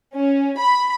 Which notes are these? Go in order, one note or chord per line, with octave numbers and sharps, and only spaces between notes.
C#4
B5